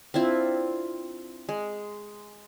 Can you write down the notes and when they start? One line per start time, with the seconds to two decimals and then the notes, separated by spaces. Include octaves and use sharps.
0.14 C4 D4 E4 F4
1.49 G#3